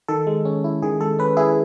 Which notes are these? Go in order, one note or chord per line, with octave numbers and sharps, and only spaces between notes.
D#3 A4
G#3
C#4
E4
D#3 G#4
G#3 A4
C#4 B4
E4 G#4